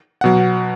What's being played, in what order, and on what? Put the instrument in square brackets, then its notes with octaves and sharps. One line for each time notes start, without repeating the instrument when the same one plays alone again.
[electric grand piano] B2 F#3 F#5